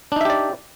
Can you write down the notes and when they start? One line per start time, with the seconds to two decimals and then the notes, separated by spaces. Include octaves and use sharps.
0.12 D4
0.16 D#4
0.21 E5
0.25 G4
0.30 D5